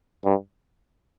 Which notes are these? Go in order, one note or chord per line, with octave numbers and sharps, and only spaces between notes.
G2